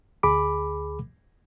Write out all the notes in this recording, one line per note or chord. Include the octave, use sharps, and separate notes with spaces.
D2 G#4 B5 D6